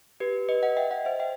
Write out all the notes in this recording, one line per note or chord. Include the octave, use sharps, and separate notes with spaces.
G4 B4
B4 D#5
D#5 F#5
E5 G5
D#5 F#5
C5 E5
E5 G5